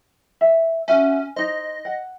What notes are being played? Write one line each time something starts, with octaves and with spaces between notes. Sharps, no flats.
E5
C#4 F#4 E5 F#5
D#4 C5 D#5
F#5